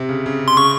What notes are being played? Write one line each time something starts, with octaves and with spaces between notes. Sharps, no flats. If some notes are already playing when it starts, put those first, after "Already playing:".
Already playing: C3
C#3
C#3
C6
C#3 C#6